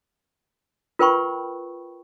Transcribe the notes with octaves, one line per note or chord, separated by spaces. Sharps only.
F4 A#4 B4 G5 B5 C#6